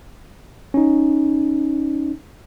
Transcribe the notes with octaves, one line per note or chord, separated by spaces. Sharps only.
C#4 D#4